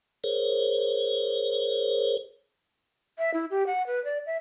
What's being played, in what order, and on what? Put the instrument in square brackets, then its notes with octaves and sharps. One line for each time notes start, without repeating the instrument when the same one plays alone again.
[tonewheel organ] G#4 A#4 C5 C#5
[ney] E5
E4
G4
F#5
B4
D5
E5